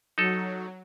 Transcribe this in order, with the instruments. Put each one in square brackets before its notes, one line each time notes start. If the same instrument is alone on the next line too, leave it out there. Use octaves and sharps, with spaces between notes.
[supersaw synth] F#3 [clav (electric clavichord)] D#4 A4